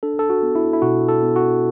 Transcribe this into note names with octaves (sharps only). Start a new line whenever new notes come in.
D4 A4
A4
F#4
B3
E4
E4
B2 F#4
A4
B3
F#4